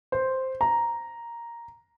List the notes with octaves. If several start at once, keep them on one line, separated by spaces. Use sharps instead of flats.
C5
A#5